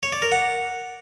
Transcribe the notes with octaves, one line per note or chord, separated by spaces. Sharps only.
C#5
D5
A#4
F#5